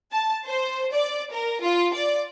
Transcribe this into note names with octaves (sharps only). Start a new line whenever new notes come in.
A5
C5
D5
A#4
F4
D5